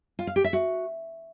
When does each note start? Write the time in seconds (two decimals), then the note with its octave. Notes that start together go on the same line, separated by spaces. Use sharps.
0.19 F4
0.27 F5
0.36 G4
0.44 E5
0.53 F#4